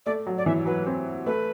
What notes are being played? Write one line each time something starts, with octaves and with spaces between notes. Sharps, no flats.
A3 D5
F#3
D5
E3 E5
F#3 B4
C4
A3 B4